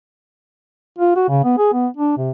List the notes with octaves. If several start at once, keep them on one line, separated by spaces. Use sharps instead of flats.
F4
F#4
C#3
B3
G#4
B3
D4
C3